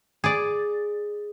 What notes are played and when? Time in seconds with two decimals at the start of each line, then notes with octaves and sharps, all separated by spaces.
0.24 G#4 D5